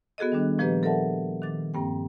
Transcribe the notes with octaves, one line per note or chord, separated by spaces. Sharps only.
B3 F#4 G#4 A4 D#5
D#3 G3 D4 F#6
A#2 F3 A#3 G4 B4 D#5
A4 A#4 D5 E5 F#5 A5
D#3 D6 A6
G2 A#3 C4 G5